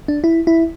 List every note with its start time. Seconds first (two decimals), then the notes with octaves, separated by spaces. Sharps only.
0.08 D4
0.24 E4
0.47 E4